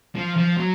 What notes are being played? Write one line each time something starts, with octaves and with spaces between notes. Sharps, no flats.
F3
F3
F#3